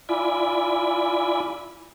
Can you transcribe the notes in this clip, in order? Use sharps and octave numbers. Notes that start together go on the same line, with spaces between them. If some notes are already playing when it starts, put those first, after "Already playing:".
E4 F4 D5 G#5 B5